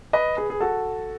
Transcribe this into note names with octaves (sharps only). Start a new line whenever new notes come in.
B4 D#5
G#4 B4
G#4
F#4 A4